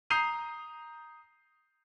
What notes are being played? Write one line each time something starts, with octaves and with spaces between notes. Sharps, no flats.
A#5 D#6 G6 C7 D#7 F7